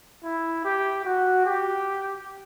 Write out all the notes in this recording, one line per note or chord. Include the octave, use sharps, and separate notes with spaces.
E4
G4
F#4
G4